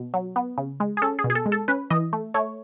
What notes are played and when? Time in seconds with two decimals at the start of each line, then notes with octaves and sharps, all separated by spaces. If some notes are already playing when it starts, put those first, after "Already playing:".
Already playing: B2
0.14 F#3
0.36 B3
0.58 C#3
0.80 G#3
0.97 G#4
1.02 C#4 A4
1.19 G#4
1.24 B2
1.30 G#4
1.35 A4
1.46 G#3
1.52 A4
1.68 C#4 B4
1.90 E3 D#5
2.13 A3
2.34 A3 C#5